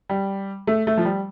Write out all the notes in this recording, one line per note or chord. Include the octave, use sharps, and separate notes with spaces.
G3
A3
A3
F3
G3